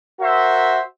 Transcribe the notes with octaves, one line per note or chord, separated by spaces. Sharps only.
F#4 A#4 C5 E5